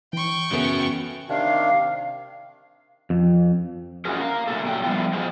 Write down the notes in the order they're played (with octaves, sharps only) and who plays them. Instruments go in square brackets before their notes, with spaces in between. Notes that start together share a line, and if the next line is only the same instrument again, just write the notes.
[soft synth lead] E3 [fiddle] G5 C#6
[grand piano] C#3 A3 B3 [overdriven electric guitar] F#3 C#4
[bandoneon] C3 D#3 D4 [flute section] F5
[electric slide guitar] F2
C#4 F4 F#4 G#4 A#4
A#4 F5
A2 C3 A#3 A4
A#2 F#3 G5
F3 G3 B3 E4 F4
F3 G#3 C4